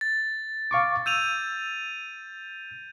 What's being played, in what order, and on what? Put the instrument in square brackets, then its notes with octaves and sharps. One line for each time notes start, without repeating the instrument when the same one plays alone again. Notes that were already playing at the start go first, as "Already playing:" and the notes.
[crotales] A6
[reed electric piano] F5 C#6 D6
[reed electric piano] E6 [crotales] G6 D#7 F7